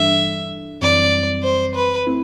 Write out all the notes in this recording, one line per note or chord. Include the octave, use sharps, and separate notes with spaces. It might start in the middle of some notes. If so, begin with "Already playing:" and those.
Already playing: G2 E3 G3 D4 A4 E5
F#2 E3 G3 C4 D5
C5
B4
A3 C4 E4